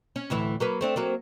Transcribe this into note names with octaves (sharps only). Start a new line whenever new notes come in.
C#4
D2 A2 E3
F#3 A#3 B4
A3 C4 D4
F#3 A#3 C4